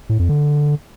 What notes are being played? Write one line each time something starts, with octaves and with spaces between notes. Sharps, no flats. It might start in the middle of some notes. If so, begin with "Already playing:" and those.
A2
F2
D3